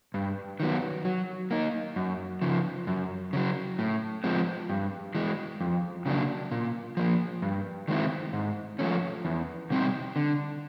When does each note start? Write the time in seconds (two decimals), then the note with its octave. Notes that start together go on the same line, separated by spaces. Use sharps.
0.14 G2
0.60 D#3 F#3 B3
1.05 F#3
1.51 A#3 D#4
1.96 F#2
2.42 C#3 F3
2.87 F#2
3.33 C#3 F#3
3.79 A2
4.24 F3 G#3 C4
4.70 G2
5.15 E3 G#3
5.60 F2
6.06 C#3 F#3 A#3 D4
6.51 A#2
6.97 F3 A#3
7.42 G2
7.88 D#3 G#3 C4 E4
8.33 G#2
8.79 F3 A3 C#4
9.25 E2
9.70 B2 G3 C4 D#4
10.16 D3